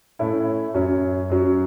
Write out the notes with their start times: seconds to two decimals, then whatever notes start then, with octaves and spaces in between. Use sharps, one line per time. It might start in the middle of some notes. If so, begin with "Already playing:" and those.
0.19 A2 A3 C#4 E4
0.74 F#2 F#3 C#4
1.30 F#2 F#3 C#4